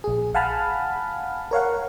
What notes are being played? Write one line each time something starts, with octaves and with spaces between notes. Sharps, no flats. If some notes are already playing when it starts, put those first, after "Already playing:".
A#1 G#4
F5 F#5 G#5 A5 B5 F6
A#4 C#5 F5 F#5